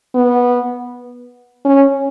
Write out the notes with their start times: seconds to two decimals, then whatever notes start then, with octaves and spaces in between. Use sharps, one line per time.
0.15 B3
1.65 C#4